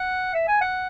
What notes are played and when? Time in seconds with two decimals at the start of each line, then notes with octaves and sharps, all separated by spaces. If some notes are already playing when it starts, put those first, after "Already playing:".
Already playing: F#5
0.34 E5
0.48 G#5
0.61 F#5